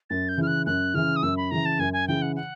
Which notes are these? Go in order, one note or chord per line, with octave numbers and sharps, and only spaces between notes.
F#2 A6
G6
C#3 E3 F6
F#6
F#2 F#6
C#3 E3 F6
D#6
F#2 E6
B5
C#3 E3 A#5
A5
F#2 G#5
G#5
C#3 E3 G5
F#5
F#5